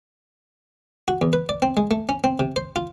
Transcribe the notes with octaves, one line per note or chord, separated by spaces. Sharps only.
F#4
E2
B4
D5
C4
G#3
A3
C#4
C4
C3
C5
F4